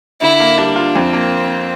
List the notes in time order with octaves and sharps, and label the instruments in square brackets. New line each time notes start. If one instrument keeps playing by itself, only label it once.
[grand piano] D3 [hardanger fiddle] E4
[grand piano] A#3
[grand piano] G3 [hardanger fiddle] D4
[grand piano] F4
[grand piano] F2 [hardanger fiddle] C4
[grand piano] A#3